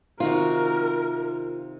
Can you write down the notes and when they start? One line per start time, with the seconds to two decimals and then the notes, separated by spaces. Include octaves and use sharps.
0.20 C3 D#3 F4 F#4 A#4